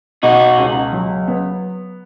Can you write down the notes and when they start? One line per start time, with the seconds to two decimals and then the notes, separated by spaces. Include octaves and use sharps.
0.23 B2 D#4 F#4
0.58 C#2
0.92 F#3
1.28 B3